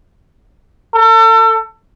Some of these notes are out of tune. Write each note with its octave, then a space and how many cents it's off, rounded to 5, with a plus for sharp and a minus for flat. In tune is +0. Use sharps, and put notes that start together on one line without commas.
A4 +35